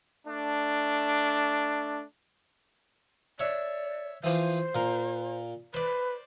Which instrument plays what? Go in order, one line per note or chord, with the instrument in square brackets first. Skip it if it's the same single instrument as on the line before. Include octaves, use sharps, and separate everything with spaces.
[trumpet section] A3 D4
[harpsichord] C#5 E5 [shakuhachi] D5
[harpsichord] E3 F3 [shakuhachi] C5
[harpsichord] A#2 A#4
[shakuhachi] B4 [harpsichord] C5 D5